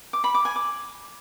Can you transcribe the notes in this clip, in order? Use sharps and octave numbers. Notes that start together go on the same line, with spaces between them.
D6
B5
D6
G#5
D6